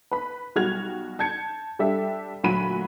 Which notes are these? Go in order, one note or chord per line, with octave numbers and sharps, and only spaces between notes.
B4 B5
B1 G3 F#4 F6 G#6 F7
A5 G6 G#6 C#7
G3 D4 G4 A4 E5
D2 A#2 F#3 F#4 B5 D#7